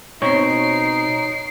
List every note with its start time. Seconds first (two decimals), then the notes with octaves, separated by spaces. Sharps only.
0.22 B2 C4 C#4 D#4 C#5 C7 D7